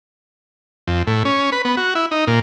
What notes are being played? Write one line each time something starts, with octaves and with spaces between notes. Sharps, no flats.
F2
A2
C#4
B4
B3
F#4
E4
D#4
A#2